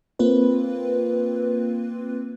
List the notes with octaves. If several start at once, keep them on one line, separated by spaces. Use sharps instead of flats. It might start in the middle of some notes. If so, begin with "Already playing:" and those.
A#3 C4 F4 B4